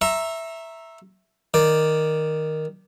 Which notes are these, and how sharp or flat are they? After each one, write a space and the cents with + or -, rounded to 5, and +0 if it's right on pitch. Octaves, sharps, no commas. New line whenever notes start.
E5 +0 A#5 +0 C#6 -40
D#3 +0 D5 +0